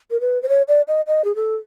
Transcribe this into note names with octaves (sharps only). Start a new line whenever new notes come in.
A#4
B4
C5
C#5
D5
D#5
D#5
G#4
A4